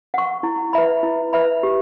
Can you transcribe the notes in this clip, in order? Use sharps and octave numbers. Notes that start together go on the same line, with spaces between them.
F#5 C#6
E4
B4 E5 B5
E4
B4 E5 B5
G4